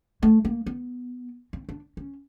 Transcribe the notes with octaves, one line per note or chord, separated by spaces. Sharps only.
A3
A#3
B3
C4
D4
C#4